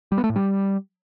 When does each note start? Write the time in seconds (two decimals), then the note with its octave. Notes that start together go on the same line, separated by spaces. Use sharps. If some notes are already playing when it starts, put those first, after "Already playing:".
0.12 G3
0.18 B3
0.24 A3
0.30 A2
0.36 G3